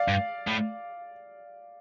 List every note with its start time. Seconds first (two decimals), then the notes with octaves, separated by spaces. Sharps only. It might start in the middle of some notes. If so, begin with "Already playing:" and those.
Already playing: D5 F5
0.08 G2
0.47 A2